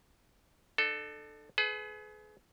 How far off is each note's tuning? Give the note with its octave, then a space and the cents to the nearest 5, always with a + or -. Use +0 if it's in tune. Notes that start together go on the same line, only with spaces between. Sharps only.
D4 +45 A4 +0
G#4 +35 B4 +30